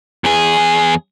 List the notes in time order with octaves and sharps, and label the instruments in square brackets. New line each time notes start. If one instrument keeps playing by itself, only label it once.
[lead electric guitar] E2 G#4